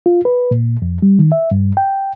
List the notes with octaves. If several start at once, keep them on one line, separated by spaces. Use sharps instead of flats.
F4
B4
A#2
F2
G3
D#3
E5
G2
G5